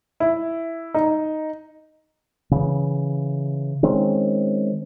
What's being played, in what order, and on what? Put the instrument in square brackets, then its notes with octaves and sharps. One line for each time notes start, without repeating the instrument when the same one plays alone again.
[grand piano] E4
D#4
[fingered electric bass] C#3 E3
D#3 G#3 C4 C#4